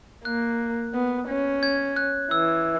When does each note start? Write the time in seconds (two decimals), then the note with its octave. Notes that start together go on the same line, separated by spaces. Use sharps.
0.25 A#3 F#6
0.94 B3
1.28 C#4
1.63 G#6
1.96 F#6
2.31 E3 E6